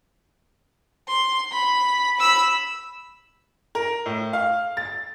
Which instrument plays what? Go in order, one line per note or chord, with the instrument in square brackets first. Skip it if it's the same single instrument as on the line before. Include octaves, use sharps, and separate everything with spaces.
[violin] C6
B5
B5 E6
[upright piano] A#4
A2
F5
A6